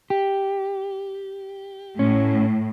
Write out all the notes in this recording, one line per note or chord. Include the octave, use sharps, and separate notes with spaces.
G4
A2 C#4